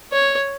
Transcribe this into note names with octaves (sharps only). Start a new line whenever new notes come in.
C#5